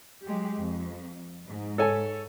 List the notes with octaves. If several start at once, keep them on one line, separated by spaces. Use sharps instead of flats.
F#3 G#3 G4
F2
G#2
A4 C#5 G#5